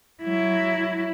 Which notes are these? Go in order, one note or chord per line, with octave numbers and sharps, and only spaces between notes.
F#3 E4